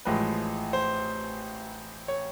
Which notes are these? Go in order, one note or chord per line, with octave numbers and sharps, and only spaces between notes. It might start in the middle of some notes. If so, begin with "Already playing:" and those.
A1 A2 F3 G#3 B4
C5
C#5